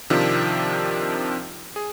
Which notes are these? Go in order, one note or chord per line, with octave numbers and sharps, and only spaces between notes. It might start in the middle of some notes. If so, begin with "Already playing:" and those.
C3 D#3 F3 C4 D4 F4
G#4